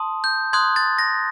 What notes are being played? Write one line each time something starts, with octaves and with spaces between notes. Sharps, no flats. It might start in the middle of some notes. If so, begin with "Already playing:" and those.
Already playing: A5 C6 D#6
G6
C6 D#6 F#6 G#6
A6
A#6